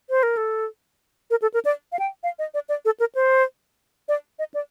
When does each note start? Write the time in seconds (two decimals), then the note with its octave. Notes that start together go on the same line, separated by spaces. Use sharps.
0.10 C5
0.23 A#4
0.37 A4
1.30 A#4
1.42 A4
1.54 A#4
1.65 D5
1.92 F5
1.99 G5
2.23 F5
2.39 D#5
2.54 D5
2.69 D5
2.85 A4
3.00 A#4
3.15 C5
4.08 D5
4.39 D#5
4.54 D5